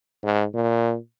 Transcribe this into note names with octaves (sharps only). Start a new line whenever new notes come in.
G#2
A#2